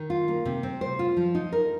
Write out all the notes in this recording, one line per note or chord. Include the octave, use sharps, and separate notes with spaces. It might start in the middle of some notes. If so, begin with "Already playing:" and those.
Already playing: D#3
F4
A#3
C3
C4
C5
F4
F3
D#4
A#4